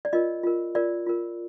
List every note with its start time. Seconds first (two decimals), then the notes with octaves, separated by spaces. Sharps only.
0.05 D5
0.13 F4 A#4 D#5
0.43 F4 A#4
0.75 F4 A#4 D5
1.06 F4 A#4